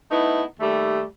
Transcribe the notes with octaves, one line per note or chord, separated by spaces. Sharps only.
A3 B3 D#4 E4
D#2 G3 A3